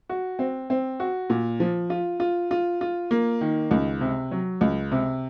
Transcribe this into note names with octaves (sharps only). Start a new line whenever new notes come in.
F#4
C4
C4
F#4
A#2
F3
F4
F4
F4
F4
A#3
D#3
C#2
C3
F#3
C#2
C3